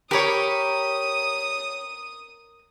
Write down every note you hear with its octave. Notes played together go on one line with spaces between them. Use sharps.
G4 A#4 C#5 B5 D#6